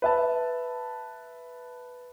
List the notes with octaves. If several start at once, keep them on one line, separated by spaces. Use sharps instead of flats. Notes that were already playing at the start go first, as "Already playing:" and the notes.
B4 E5 A5